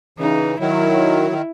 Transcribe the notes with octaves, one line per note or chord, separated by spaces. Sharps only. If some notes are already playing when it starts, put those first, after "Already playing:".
C#3 E3 D#4
D#3 F#3 E4
D#3